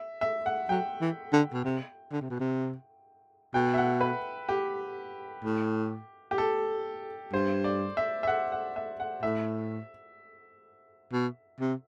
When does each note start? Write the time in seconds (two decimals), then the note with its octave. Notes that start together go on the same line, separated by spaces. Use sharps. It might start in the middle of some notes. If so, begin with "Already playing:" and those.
Already playing: E5
0.21 E5
0.46 F#5
0.69 F#3 G5
1.01 E3
1.32 D3
1.53 B2
1.64 C3
2.12 D3
2.21 C3
2.30 B2
2.40 C3
3.54 B2 G5
3.74 E5
3.78 F#5
4.01 B4
4.49 G4
5.44 A2
6.31 G4
6.38 A4
7.33 G2 C5
7.64 D5
7.97 E5
8.23 E5
8.28 F#5
8.52 F#5
8.76 E5
9.00 F#5
9.23 A2 E5
11.13 B2
11.60 C3